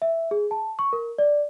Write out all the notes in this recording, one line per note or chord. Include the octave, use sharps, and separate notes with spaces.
E5
G#4
A5
C#6
A#4
D5